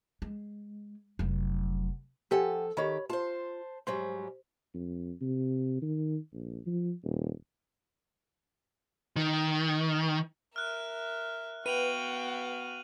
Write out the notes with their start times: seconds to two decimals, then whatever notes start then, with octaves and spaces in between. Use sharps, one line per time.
0.22 G#3
1.19 F1 F#3
2.31 F3 G4 A4 F#5 G#5
2.77 D#3 G4 C#5 B5
3.09 F4 C5 A5
3.87 G#2 F#3 G3 C5
4.74 F2
5.21 C3
5.82 D#3
6.33 A#1
6.66 F3
7.04 D#1
9.16 D#3
10.56 A#4 E5 F6 F#6
11.66 B3 F#4 B4 F5 G5 D#7 F7 F#7